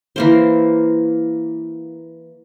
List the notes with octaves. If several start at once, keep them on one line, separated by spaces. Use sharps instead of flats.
E3 A#3 C5